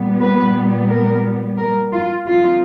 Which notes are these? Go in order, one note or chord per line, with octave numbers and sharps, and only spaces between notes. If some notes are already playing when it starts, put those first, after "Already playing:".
Already playing: A#2 G3 B3
B4
A#4
A#4
F4
D3 G3 C4 D#4 F4